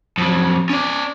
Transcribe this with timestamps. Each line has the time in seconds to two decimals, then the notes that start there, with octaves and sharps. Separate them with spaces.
0.18 F2 F#3
0.70 C#4 D5